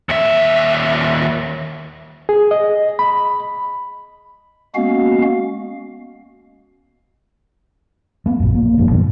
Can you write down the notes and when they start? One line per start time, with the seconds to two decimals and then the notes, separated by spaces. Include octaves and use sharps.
0.09 D#2 E5
2.29 G#4
2.51 D#5
2.99 B5
4.75 G#3 A#3 B3 C#4 F#4 F5
8.26 A3 B3
8.40 A#1 F#2
8.55 A#3
8.78 F#1 F2 G#2
8.91 F#2 B2 D3